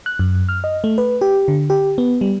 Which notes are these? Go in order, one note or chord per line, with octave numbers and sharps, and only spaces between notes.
F#6
F#2
F6
D#5
A3
B4
G4
D3
G4
B3
G3